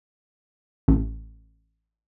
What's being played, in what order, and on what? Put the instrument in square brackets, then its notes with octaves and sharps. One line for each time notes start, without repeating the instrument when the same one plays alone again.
[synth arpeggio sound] A1